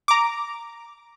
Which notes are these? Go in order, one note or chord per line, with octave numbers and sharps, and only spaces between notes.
A#5 D6